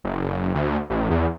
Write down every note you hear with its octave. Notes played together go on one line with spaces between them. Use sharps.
F#1
D2
A1
E2